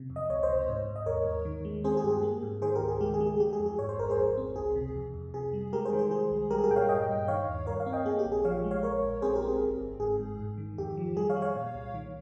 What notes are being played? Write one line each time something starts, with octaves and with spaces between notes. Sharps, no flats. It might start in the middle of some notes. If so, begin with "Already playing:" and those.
Already playing: C3
F2
D#5
C#2 C#5
C5 D#5
C3
G#2
G#2
D#5
D#2 A#4 C#5
D#2
D#3
G#3
C4 G#4 C5
G#4
G2 G4
G#4
A#3
G#2
D#3 G#4 C5
G4 A#4
C#2
G#4
G#3 G4
G#4
G#3
G#4
G#3 G4
G#4
F2
G#4
G#2 C#5
C5
G#1 A#4
G#4 C5
F2
C4
C#2 G#4
C3
F2
F2
C3 G#4
G3
G#3 G4 A#4
G#4 C5
D#3
G#4 C5
G#3 G#4
C2
G3 G4 A#4
G#4
G4 A#4
A#2 G5
C#5 F5
G2 D#5 G5
G2
D#3 C#5 F5
D#2
G2 A#4 C#5
C#5 F5
C4
D#5 G5
A#3 G#4
G4
A#1
G#4
F3 C#5 F5
G#3
C#5 F5
A#1 A#4 C#5
A#1
C4 G#4 C5
G4 A#4
C4
G#4
G1
G1
G#2 G#4
G#2
G#2
D#3
F2 G4
F3
G3 G#4
C#5 F5
G3
C#5 F5
A#2
C2
D#3